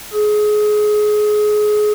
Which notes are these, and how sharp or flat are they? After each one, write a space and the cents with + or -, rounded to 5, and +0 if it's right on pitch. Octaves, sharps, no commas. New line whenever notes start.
G#4 +25